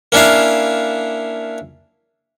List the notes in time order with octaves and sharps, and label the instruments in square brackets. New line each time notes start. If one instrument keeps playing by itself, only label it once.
[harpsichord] A#3 C#4 D4 E4 F5